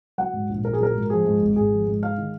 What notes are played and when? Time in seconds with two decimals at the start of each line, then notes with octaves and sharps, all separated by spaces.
0.18 F#3 F#5
0.33 G#2
0.49 A#1
0.64 A#1 A#4
0.73 G#4
0.80 F#3 A#4
0.94 G#2
1.10 F3 G#4
1.25 G#2
1.41 G#1
1.56 G#1 G#4
1.72 F3
1.87 G#2
2.03 G#3 F5
2.18 D#3